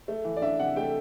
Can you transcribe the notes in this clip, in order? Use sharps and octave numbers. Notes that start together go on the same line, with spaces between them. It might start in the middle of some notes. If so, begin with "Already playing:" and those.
A3
E3
D5
D4 E5
C3 F#5
A3 G5